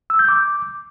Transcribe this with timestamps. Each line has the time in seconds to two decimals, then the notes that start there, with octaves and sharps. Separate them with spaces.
0.10 E6
0.19 G6
0.29 D6